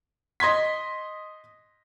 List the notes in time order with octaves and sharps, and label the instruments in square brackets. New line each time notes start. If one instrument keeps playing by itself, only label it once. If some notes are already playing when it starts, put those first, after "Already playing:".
[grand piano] D#5 C6 G#6 B6